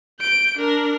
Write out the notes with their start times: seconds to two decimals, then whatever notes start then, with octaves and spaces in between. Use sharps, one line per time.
0.20 G6 D7
0.58 D4 A#4